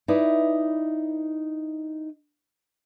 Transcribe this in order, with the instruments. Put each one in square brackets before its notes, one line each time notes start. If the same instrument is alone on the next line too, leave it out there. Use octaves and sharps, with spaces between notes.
[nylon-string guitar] D#4 E4 B4 D5